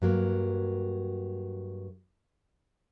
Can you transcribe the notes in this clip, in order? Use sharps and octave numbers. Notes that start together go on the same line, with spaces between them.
G2 F#3 A#3